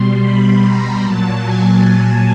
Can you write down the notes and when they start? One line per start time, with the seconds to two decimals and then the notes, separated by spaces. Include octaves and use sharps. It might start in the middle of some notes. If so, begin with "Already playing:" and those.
Already playing: B2 G3 C6
0.22 B5
0.63 A#5
1.03 A#2 F#3 A5
1.43 G#5
1.83 A5